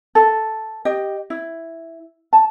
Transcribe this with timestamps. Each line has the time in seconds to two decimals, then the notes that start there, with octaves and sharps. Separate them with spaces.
0.15 A4
0.85 G4 D#5
1.30 E4
2.33 A5